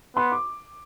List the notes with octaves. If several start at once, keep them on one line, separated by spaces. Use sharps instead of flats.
B3 C6
D6